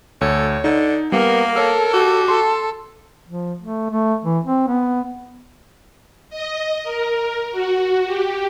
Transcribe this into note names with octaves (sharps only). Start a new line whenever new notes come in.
D2 A4 C#5
D3 D#4
G3 A#3 B3 A#4
A4 A#4 C#5 E6
F#4 G4
A4 C6
F3
A3
A3
E3
C4
B3
D#5
A#4
F#4
G4